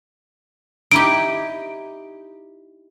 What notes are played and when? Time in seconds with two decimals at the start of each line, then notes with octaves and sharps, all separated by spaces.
0.92 D#4 E4 G4 D7